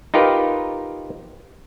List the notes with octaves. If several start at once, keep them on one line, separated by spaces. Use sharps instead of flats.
D#4 F4 G4 A#4 B4